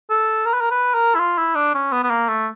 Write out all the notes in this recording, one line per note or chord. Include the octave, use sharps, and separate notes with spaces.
A4
A#4
B4
A#4
B4
A#4
E4
F4
E4
D4
C#4
B3
B3
A#3
A3